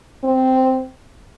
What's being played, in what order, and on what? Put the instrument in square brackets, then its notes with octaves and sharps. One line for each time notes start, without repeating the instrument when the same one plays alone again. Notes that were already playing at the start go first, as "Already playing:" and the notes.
[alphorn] C4